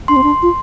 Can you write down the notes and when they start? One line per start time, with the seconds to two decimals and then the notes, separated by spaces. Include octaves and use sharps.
0.08 D4 C6
0.16 C4
0.23 D4
0.42 F4